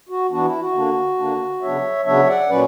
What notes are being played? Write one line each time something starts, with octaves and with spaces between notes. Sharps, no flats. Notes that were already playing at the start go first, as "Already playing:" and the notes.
F#4
E3 B3 D4 F#4
E4
F#4
D3 A#3 D4
D3 A#3 D4
C#3 F#3 B3 D4 C#5 E5
C#3 F#3 B3 D4 C#5 E5
D5 F#5
A#2 F#3 C#4 B4 D5